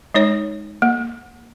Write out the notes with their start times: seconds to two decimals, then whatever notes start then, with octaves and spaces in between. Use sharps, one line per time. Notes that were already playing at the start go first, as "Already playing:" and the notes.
0.14 G#3 D#4 C#5
0.82 A#3